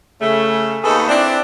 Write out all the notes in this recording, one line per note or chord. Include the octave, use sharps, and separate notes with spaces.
C#3 A3
D#2 A3 B3 D#4 G#4 A4
C4 D4 E4